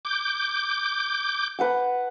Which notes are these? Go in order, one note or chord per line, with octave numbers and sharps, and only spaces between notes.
D6 G6
B4 F#5 A5